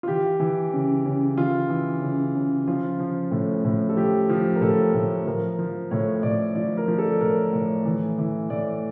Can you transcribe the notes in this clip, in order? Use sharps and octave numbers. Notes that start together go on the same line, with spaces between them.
F4
E3 G4
E3
C#3
C#3
E3 F4
E3
C#3
C#3
F3 F4
F3
A2
A2
A4
F3 G4
F3
A#4
A2 A4
A2
F3 A#4
F3
A2 C#5
A2 D5
F3 D5
A#4
F3
A4
A2 A#4
A2
E3
E3
A2 D5